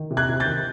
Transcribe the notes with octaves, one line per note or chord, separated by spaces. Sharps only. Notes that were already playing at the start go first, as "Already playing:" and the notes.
Already playing: D#3
C3
F#6 G#6
C3
G6 A6
D#3